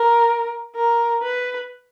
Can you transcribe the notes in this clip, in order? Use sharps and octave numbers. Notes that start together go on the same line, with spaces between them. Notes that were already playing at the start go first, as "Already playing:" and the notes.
Already playing: A#4
A#4
B4